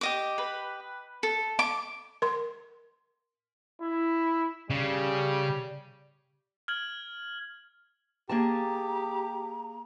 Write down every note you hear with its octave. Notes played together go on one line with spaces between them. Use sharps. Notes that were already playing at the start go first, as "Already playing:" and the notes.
G4 D#5 D6
B4
A4
D6
A#4 C6
E4
C#3 G3
F6 G#6 F#7
A#3 G4 G#4 A5 A#5